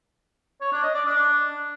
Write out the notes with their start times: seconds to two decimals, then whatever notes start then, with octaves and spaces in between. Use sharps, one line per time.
0.61 C#5
0.72 D4
0.83 D#5
0.94 D5
1.05 D4